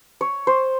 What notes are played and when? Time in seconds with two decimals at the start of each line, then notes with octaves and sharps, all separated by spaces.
0.21 C#5
0.47 C5